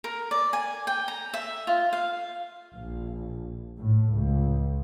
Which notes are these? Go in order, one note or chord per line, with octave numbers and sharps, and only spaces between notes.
A#4
D5
G#5
G5
A#5
E5
F4
F5
A#1
A2
C#2